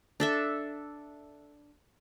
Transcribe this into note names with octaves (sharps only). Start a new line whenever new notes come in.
D4 A4 E5